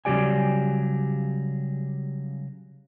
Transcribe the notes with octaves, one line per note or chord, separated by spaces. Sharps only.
C#3 F#3 G3 G4 D5 G#5